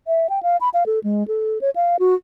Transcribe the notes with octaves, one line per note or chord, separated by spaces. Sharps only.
E5
G5
F5
B5
F5
A4
G#3
A4
C#5
F5
F#4